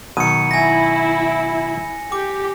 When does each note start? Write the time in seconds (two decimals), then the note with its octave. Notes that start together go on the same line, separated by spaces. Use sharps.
0.17 B2 D#3 F#3 C#7 D#7
0.51 E4 G#5 A#6
2.12 G4 D6